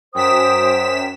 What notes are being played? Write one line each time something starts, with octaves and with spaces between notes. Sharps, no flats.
F#2 C5 G5 D#6 B6 E7